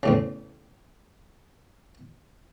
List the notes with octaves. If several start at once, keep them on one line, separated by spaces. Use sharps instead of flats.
E2 A2 C#3